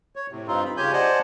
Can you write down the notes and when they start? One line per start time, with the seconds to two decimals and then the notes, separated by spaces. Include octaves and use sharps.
0.16 C#5
0.31 A2 C3
0.47 G2 C4 D#4 F4
0.66 B5
0.77 C#3 C#4 F4 G4 G#5 G6
0.93 C5 D5 D#5 F#5 G#5 A5